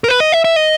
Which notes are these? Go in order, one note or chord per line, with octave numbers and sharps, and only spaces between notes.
A#4
B4
D#5
E5
E5
D#5